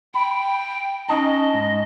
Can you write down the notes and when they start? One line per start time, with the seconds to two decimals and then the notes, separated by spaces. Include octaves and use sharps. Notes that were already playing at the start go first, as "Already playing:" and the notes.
0.14 G5 B5
1.09 C#4 D#4 D#5 A5
1.54 G#2